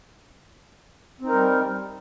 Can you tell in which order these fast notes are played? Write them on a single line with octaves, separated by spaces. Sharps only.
C4 D#4 A#4 G3